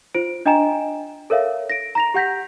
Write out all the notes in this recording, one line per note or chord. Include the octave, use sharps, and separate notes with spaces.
F4 C5 D7
D4 D#5 G5 G#5 A#5 E7
A4 A#4 C#5 E5 F5
A#6 D7
A#5 A#6 F7
G4 F#5 G6 A#6 B6